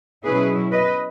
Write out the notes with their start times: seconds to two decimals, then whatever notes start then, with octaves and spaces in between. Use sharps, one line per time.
0.25 B2 F#3 C#4 E4 G#4 B4
0.72 B4 D#5